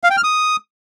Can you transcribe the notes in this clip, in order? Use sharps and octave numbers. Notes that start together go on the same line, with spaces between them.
F5
G5
F6
D#6